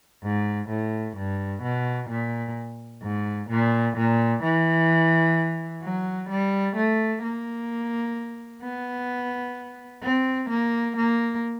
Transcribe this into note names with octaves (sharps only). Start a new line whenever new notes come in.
G#2
A2
G2
B2
A#2
G#2
A#2
A#2
E3
F#3
G3
A3
A#3
B3
C4
A#3
A#3